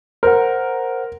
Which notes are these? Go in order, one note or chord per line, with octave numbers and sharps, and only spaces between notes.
A#4 C5 F#5